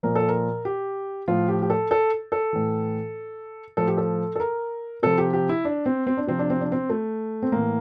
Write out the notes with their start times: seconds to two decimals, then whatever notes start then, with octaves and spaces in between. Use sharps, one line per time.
0.03 A#2 F3 A#4
0.15 A4
0.28 A#4
0.65 G4
1.28 A2 F3 F4
1.49 G4
1.62 G4
1.70 A4
1.91 A4
2.32 A4
2.53 A2 E3
3.77 A2 F3 A4
3.88 G4
3.97 A4
4.36 A4
4.40 A#4
5.03 C3 F3 A4
5.18 G4
5.33 G4
5.49 E4
5.65 D4
5.86 C4
6.07 C4
6.17 D4
6.27 C3 F3 C4
6.39 D4
6.50 C4
6.61 D4
6.72 C4
6.90 A3
7.43 C4
7.52 A2 E3 A#3